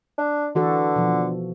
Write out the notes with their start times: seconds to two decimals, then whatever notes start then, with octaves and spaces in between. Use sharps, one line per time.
0.18 D4
0.55 D3 E3 F#4 A4
0.96 B2 F3